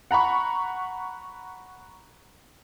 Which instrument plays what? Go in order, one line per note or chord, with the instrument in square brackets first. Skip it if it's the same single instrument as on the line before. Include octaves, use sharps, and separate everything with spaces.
[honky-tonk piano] F#5 A#5 B5 C#6